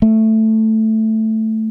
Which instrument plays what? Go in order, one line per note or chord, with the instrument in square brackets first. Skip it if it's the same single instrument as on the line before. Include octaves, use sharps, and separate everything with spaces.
[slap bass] A3